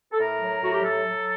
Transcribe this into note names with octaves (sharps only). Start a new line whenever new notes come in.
A4
A2 A#4
F#3
A2 F#4
G4
F#3 A4
F#3